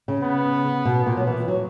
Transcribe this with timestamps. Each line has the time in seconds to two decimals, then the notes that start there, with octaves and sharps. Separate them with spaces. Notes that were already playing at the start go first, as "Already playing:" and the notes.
0.08 C#3
0.23 B3
0.85 B2
1.06 A#2
1.17 F#3
1.27 E3
1.48 F#3